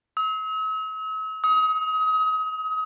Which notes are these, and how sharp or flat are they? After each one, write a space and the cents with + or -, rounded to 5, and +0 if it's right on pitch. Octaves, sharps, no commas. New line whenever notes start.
E6 -45
D#6 +30